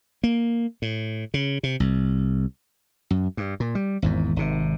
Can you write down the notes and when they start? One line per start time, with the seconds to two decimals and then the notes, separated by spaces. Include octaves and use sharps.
0.24 A#3
0.82 A2
1.34 C#3
1.63 C3
1.80 C2
3.10 F#2
3.37 G2
3.60 A#2
3.75 G3
4.02 G#1 E2 G#2
4.36 G#1 C3